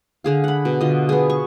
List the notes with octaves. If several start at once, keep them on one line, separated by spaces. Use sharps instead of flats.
D3 G#4 F5
F#5 B5
B2
D3 F4 D#5
B3 G#4
C#6